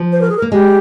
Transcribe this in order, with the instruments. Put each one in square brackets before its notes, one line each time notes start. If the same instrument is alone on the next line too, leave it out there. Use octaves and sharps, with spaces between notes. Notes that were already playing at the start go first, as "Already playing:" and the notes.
Already playing: [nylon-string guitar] F3
[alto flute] C5
A#4
G#4
A#4
[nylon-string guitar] A#3
[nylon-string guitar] G#3 [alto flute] G4